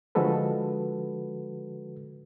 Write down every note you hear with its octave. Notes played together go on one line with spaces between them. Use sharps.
D3 F3 G#3 F#4 A4 B4